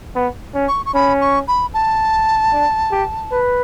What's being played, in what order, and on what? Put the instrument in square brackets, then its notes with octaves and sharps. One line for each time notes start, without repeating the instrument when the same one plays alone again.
[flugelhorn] B3
C#4
[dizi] C#6
C#6
[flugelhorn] C#4 [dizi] B5
[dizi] C#6
B5
A5
[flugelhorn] D4
G4
B4